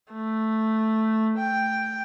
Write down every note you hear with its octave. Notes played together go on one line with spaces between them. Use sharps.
A3
G5